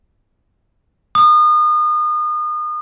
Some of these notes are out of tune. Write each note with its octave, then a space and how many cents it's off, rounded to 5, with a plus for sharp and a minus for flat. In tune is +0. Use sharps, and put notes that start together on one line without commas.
D#6 -35